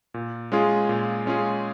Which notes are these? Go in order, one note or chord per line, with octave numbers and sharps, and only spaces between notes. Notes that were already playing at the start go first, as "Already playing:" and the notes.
A#2
G#3 C#4 F4 G#4
A#2
G#3 C#4 F4 G#4